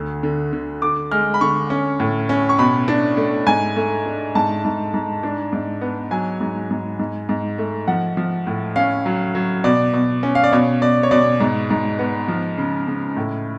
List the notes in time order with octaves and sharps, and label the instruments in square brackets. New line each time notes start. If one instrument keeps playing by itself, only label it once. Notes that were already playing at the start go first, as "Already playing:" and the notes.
Already playing: [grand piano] D2 D3
D3
D3
D3 D6
G#3 F6
B5
D3 C#6
C#4
A2
C#4
C#6
B2 B5
D4
A3
G#2 G#5
A3
D4
G#2 A5
G#2
G#2
D4
G#2
B3
F#3 G#5
G#2
G#2
G#2
G#2
A3
F3 F#5
F3
A2
C#4 F5
F#3
F#3
B2 D5
B2
C#4
F5
D5
B2 C#5
B2 D5
C#5
B2 D5
G#2
G#2
B3
F3
C#3
C#3
A2